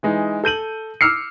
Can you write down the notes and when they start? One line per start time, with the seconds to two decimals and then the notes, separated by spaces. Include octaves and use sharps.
0.03 E3 G#3 D#4
0.44 A4 G6 D#7 F#7
1.01 D6 E6 F6 C7 C#7